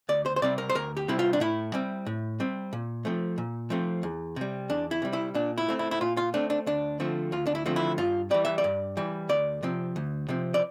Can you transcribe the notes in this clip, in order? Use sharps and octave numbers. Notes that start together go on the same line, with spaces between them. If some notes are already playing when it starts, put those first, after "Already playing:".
D2 D5
C5
C5
C3 G3 C4 D5
A#4
C5
D2 A#4
G4
C3 G3 C4 E4
F4
D4
A2 E4
G3 C4
A2
G3 C4
A#2
F3 A3 C4
A#2
F3 A3 C4
E2
C3 G3
E2 D4
E4
C3 G3
E4
A#2 D4
E4
A3 C4
E4
E4
A#2 F4
F4
A3 C4 D4
D4
D2 D4
D3 F3 A3 C4
D2 F4
D4
E4
D3 F3 A3 C4
E4
G2 F4
E3 G3 D5
E5
D5
G2
E3 G3
D2 D5
C3 F3 C4
D2
C3 F3 C4
D5